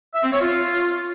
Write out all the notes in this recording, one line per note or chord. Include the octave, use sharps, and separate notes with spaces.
E5
C4
C#5
F4